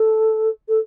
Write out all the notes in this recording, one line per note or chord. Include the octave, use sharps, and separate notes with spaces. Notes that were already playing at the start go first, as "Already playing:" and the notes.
Already playing: A4
A4